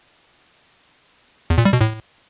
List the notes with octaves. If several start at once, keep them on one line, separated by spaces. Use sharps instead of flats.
E2
A#2
G3
B2
A2